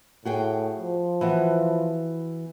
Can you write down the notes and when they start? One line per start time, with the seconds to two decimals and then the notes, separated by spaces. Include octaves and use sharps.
0.25 A2 F#4 G#4 G5
0.77 F3
1.21 E3 B3 F#4